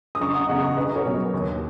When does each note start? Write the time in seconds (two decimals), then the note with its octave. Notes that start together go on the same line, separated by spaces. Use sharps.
0.15 D#6
0.21 F#1 A#5 C#6
0.34 F#5 A#5
0.48 E2 D#5 F#5
0.52 C#3
0.62 A#5 C#6
0.76 B1 B4 D#5
0.96 A#4 C#5
1.05 B2 F#3
1.33 D#2